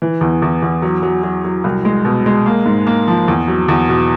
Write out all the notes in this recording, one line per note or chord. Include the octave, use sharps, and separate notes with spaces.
E3
E2
E2
E2
F#3
F#3
F#3
F#3
C2
G#3
B2
G#3
A#3
G#2
A#3
F3
E2
F#3
E2
B2